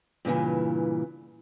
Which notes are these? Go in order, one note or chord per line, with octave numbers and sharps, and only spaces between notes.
G2 A#2 C#3 E3